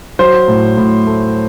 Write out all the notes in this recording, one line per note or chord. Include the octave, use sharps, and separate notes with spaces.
F#3 C5
A2
A2
A3